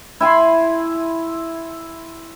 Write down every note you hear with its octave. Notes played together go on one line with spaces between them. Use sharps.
E4 G#5 B5 C6